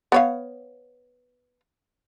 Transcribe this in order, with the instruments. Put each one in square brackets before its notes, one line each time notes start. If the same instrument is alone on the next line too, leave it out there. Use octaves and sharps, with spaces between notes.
[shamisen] B3 C#5 F5